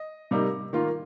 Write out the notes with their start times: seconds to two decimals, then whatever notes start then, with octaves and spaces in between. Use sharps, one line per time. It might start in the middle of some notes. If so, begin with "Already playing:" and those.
Already playing: D#5
0.31 C3 G3 A#3 D#4
0.73 D#3 A#3 F4